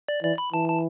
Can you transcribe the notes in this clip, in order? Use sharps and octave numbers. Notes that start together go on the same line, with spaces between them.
D5
E3 D5
B5
E3 A5
A5